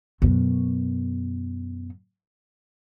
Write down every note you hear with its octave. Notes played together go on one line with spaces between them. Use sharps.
F#2 B2